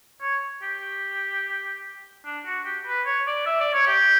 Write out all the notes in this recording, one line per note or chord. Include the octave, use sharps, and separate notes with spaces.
C#5
G4
D4
F#4
G4
B4
C#5
D5
E5
D5
C#5
G4